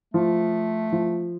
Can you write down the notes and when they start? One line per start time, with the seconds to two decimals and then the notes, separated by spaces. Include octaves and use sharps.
0.14 F3 A3
0.92 F3